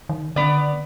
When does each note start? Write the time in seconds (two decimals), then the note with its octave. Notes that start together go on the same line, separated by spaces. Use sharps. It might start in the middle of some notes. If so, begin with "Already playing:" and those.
0.09 D#3
0.36 D3 B3 D5